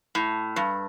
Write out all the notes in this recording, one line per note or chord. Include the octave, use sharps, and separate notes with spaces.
A2
G2